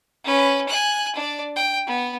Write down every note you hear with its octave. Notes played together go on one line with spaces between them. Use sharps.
C#4 B4
G#5 F#6
D4 D5
G5
B3